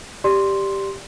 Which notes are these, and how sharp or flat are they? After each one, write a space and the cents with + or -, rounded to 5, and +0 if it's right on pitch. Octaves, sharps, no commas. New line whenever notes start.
G4 +0 D5 +0 C6 +0